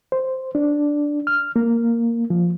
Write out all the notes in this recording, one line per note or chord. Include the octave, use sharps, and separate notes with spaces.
C5
D4
F6
A#3
F3